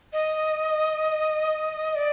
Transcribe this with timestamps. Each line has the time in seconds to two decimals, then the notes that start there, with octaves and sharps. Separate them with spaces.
0.13 D#5
1.96 D5